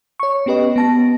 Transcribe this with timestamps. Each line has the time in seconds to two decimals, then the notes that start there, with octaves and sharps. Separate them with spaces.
0.20 C#5 C#6
0.46 B3 C#4 G4 B4 D#5
0.76 B3 A5 A#6